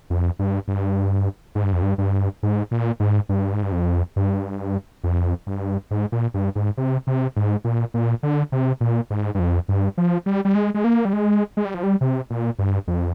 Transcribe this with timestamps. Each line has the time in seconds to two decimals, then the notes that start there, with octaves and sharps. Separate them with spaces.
0.10 F2
0.39 G2
0.68 G2
1.55 G#2
1.64 G2
1.73 F2
1.82 G2
1.98 G2
2.43 G#2
2.71 A#2
3.00 G#2
3.29 G2
3.53 G#2
3.63 G2
3.72 F2
4.16 G2
5.04 F2
5.47 G2
5.91 G#2
6.12 A#2
6.34 G2
6.55 G#2
6.77 C3
7.07 C3
7.36 G#2
7.64 A#2
7.94 A#2
8.23 D3
8.52 C3
8.81 A#2
9.10 G#2
9.35 G2
9.39 F2
9.68 G2
9.98 F3
10.26 G3
10.45 G3
10.55 G#3
10.74 G#3
10.84 A#3
11.05 G3
11.13 G#3
11.57 G#3
11.65 G3
11.74 F3
11.83 G3
12.01 C3
12.30 A#2
12.59 G2
12.88 F2